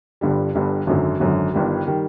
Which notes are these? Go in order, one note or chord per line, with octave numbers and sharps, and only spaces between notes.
G1 G2 D3 G3
G1 G2 D3 G3
G#1 F#2 D3 F#3
G#1 F#2 D3 F#3
G1 G2 D#3 G3
D#3 G3